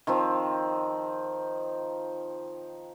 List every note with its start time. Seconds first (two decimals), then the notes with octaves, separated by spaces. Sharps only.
0.07 D#3 F3 C4